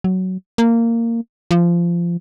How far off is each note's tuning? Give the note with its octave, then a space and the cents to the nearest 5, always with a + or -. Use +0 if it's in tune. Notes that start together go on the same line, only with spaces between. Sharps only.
F#3 +10
A#3 -15
F3 -20